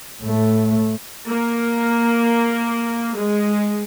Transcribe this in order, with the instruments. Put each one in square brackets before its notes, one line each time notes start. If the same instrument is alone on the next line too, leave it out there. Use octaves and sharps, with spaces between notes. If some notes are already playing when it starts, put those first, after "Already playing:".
[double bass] A2 A3
[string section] A#3
G#3